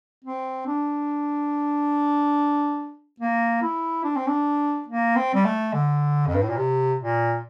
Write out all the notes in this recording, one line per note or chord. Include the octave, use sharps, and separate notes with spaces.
C4
D4
A#3
E4
D4
C4
D4
A#3
C4
G3
A3
D3
F2
G2
A2
A#2
C3
A#2